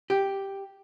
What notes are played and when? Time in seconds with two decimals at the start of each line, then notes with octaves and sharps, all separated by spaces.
0.10 G4